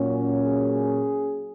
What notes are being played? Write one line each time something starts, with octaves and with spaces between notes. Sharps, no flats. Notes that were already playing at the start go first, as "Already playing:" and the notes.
Already playing: A#2 F#3 A#3 C#4 F#4
G#4